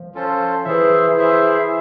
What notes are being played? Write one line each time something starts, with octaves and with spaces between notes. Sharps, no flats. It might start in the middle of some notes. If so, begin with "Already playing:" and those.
Already playing: F3
C#4 F4 A4 C5
E3 E4 G#4 C5 E5
E4 G#4 C5 E5